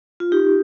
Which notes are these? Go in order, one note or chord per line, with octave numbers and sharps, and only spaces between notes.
F4
D#4 G4